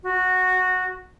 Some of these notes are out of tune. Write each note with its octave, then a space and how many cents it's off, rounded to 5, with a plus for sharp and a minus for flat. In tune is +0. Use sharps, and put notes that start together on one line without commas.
F#4 -10